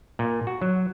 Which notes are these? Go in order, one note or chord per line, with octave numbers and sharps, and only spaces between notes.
A#2
F#4
F#3